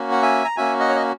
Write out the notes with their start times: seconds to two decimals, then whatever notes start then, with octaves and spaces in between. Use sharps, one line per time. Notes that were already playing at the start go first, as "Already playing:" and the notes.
Already playing: A#3 C#4 F#4
0.11 F#5
0.22 E5 G#5
0.44 A#5
0.56 A#3 C#4 F#4 E5 G#5
0.80 D#5 F#5
0.89 C#5
0.96 D#5